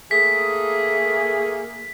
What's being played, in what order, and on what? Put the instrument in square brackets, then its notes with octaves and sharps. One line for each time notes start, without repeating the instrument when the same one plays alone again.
[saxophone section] A3 A#3 G#4 [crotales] B6